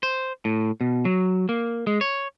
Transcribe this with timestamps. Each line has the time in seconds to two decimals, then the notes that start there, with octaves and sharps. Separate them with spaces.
0.03 C5
0.45 A2
0.81 B2
1.05 F#3
1.49 A#3
1.87 G#3
2.01 C#5